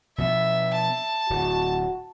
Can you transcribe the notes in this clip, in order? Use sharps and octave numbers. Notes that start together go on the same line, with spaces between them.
B2 F3 B3 E5
A5
D1 F#4